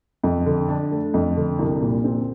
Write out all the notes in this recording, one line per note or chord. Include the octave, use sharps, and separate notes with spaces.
F2
D3
D4
A3
F2
D3
C2
A#2
C4